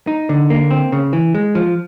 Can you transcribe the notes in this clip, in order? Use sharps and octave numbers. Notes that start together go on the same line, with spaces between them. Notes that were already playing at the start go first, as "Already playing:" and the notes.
D#4
D3
A#3
C4
C#3
E3
G#3
F3